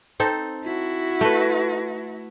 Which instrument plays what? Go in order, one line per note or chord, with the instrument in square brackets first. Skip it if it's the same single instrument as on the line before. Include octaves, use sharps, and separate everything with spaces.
[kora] C4 D#4 A4
[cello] E4 F#4
[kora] A3 B4